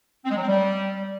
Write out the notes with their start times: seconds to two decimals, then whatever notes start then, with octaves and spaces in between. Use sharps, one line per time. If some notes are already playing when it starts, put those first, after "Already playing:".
0.25 C4
0.31 G#3
0.36 F#3
0.42 C4
0.47 G3